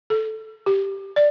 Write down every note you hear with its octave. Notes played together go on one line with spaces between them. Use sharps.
A4
G4
D5